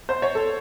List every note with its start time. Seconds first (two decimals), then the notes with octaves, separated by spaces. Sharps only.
0.09 C5
0.22 C#5
0.35 A4